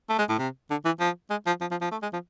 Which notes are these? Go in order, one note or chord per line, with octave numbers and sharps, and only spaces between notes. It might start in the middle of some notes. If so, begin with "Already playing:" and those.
A3
G#3
A2
C3
D3
E3
F3
G#3
F3
F3
F3
F3
A3
G#3
F3